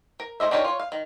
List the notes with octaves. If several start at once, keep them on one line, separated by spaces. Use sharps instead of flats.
A#4
A3 A4 C5 D#5 E5
D4 D#4 G4 A#4 C#5
F4 C#5
F5
D#3